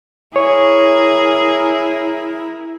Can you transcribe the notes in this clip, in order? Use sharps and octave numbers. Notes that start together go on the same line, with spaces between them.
E4 G#4 A#4 C#5